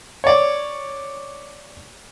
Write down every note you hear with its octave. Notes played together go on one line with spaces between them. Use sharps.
C#5 D5